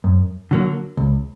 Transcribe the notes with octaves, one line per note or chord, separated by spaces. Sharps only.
F#2
D3 F#3 A#3
C#2